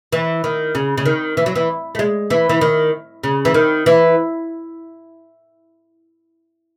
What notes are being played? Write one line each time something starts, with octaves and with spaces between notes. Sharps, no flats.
E3
D#3
C#3
C#3
D#3
E3
F#3
E3
A3
G#3
E3
E3
D#3
C#3
E3
D#3
E3